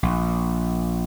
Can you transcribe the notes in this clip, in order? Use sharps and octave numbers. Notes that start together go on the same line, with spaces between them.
A#1